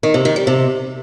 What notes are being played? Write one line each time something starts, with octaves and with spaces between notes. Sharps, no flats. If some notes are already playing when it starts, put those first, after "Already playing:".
D#3
C3
D#3
G3
C3